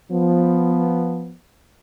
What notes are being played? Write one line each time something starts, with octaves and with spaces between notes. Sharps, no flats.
F3 B3